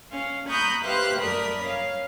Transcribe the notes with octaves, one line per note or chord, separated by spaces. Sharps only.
C#4 F5
A#5 B5 C#6 D#6 F#6 G6
G4 B4 C5 E5 F5 F#6
F#2 A3 A#4 D5 B5 D#6
C#4 F5